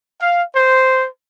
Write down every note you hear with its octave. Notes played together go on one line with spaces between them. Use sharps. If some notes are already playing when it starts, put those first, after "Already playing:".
F5
C5